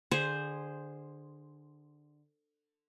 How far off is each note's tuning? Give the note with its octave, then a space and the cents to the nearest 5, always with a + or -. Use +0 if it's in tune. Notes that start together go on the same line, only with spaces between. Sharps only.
D3 +20 G#4 -10 C5 +0